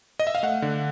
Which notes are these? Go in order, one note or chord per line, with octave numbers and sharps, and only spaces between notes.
D#5
E5
F5
A3 F#5
D3